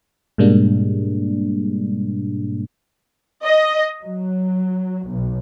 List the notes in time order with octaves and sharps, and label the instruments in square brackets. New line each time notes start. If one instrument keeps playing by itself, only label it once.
[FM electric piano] G#2 B2 G3 G#3 A#3 D4
[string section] D#5
F#3
B1